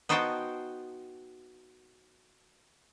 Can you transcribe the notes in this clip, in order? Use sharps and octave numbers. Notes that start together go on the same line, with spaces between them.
B3 D#4 F#4 C5 G5 A5